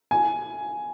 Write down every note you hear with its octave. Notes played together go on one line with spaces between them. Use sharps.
G#5